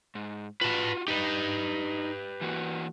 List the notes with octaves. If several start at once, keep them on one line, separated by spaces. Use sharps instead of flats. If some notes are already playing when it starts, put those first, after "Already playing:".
G#2
F4 F#4 B4 A5
D#4 G4 B4
E3 A#3 F#4